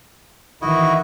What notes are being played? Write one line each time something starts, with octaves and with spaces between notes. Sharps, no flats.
D#3 E3 E4 F#4 D#5